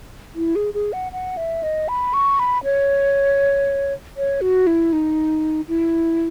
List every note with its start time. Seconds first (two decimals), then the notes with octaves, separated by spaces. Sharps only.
0.36 E4
0.56 G#4
0.74 G#4
0.93 F#5
1.12 F#5
1.37 E5
1.63 D#5
1.88 B5
2.14 C#6
2.39 B5
2.64 C#5
4.17 C#5
4.41 F#4
4.67 E4
4.93 D#4
5.68 E4